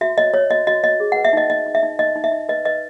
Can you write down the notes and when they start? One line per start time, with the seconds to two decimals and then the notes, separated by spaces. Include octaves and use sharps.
0.01 F#4 E5
0.18 C#5 D#5
0.34 C#5
0.50 F#4 D#5
0.67 F#4 D#5
0.83 C#5 D#5
1.00 G#4
1.12 B4 F#5
1.25 E5
1.33 D#4 D#5
1.50 D#4 D#5
1.66 D#4
1.75 E5
1.83 D#4
1.99 D#4 D#5
2.16 D#4
2.24 E5
2.32 D#4
2.49 B4 D#5
2.65 B4 D#5